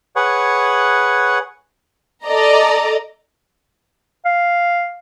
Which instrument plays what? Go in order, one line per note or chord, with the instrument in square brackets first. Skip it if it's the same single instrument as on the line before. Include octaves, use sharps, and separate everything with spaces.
[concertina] G#4 B4 C#5 F#5
[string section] A4 D5 D#5 A#5
[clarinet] F5